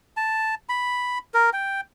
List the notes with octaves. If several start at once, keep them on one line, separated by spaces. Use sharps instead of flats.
A5
B5
A#4
G5